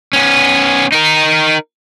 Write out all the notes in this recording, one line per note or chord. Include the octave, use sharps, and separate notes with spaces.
B3 C#4
D#4 A#4